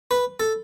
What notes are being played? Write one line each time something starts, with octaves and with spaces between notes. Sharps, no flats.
B4
A4